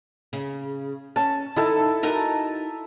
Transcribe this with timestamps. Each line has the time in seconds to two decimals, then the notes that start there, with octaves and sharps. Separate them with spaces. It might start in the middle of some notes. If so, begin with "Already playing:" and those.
0.33 C#3
1.16 C#4 A5
1.56 D#3 D#4 E4 A4 A5
2.03 D#4 F#4 A#4